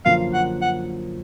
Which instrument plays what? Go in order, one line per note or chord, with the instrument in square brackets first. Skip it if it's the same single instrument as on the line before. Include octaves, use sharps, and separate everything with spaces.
[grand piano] F#2 D3 F3 A#3 [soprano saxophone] F5
[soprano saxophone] F#5
F#5